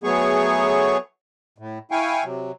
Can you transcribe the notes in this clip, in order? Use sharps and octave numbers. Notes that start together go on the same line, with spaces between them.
F#3 A3 B3 G#4 C#5 C#6
A2
E4 F5 G5 G#5 C#6
C3 F#3